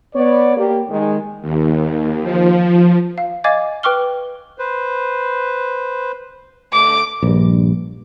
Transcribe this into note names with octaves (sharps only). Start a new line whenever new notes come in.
B3 C#5 D5
A#3 G4
D#3 G#3
D#2
F3
F5
D#5 F5 G#5 D6 G#6 A6
B4 G5 C#6 D6 F6 G7
B4 C5
D3 A3 D6
A#1 G2